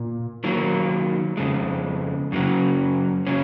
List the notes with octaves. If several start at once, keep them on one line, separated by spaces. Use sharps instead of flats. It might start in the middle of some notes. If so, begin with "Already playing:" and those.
Already playing: A#2
D#3 F#3 A#3
F2 C#3 G#3
F#2 C#3 F#3 A#3
C#3 F#3 C#4